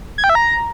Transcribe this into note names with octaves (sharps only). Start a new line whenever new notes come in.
G#6
G5
E5
A#5